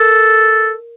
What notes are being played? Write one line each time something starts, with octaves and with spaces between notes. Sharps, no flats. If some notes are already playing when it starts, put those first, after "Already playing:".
Already playing: A4 A#4